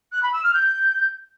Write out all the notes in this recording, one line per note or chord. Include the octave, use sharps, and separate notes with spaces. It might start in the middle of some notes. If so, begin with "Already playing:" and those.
F#6
B5
E6
F6
G6